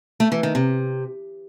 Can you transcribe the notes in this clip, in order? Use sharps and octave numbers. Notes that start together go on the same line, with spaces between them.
A3
E3
D#3
C3